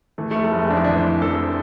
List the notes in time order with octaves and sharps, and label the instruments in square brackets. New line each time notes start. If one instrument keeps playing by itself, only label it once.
[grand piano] E3 A3
A3
F1
A3
F1 G#3
F2 D4
E4
E3 D4
C5
F1
F1 A4